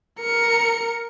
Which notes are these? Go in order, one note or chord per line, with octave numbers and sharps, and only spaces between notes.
A#4 C#7